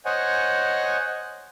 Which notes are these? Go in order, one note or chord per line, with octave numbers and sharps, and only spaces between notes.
C5 C#5 D#5 F#5 G#5